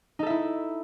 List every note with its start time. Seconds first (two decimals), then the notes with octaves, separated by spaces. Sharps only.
0.19 D#4
0.23 A4
0.26 E5
0.30 E4